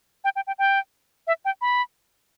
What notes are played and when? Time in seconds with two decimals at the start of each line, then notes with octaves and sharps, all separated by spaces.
0.24 G5
0.36 G5
0.47 G5
0.59 G5
1.27 E5
1.45 G5
1.61 B5